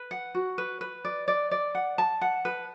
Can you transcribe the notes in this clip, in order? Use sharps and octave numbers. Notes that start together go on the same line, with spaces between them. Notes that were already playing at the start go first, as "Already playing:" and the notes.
Already playing: B4
F#5
F#4
B4
B4
D5
D5
D5
F#5
A5
F#5
B4